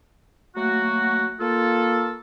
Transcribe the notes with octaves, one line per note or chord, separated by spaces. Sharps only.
F#3 A3 A#3 F#4
A#3 F4 A4